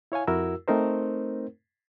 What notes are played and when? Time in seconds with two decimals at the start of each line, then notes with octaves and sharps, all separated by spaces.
0.12 E4 C#5 F5 G#5
0.27 F2 E4 F#4 A#4 E6
0.68 A3 C4 D#4 A#4 C5